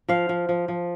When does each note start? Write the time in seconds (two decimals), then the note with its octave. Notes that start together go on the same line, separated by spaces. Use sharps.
0.09 F3 F5
0.29 F3
0.49 F3
0.68 F3